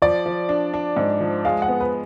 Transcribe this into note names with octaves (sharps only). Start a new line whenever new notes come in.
F3 D5
F3
D4
D4
G#2
F3
G#3 F5
F#5
B3
B4